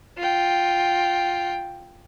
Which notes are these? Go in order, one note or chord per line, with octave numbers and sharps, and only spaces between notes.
F4 G5